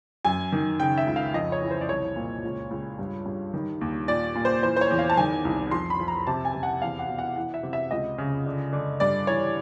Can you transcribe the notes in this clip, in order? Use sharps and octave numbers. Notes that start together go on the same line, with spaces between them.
F#2 G#5
D#3
C#3 G5
E5
C#2
F5
F2 D#5
C#5
E3
C5
D5
C2 C#5
A#2
C#2
C#2
G2
G2
D#3
D#2
A#2 D5
A#2
C5
E3 C5
C5
C#5
E2
F5
A5
D#3 G#5
C2
F2 C6
B5
F2
A#5
C3 A5
G#5
C3
F#5
E2 F5
F#5
B2
F#5
E3 F#5
E5
C3
E5
C#2 D#5
C#3
D3
D3
G2 D5
E3 C#5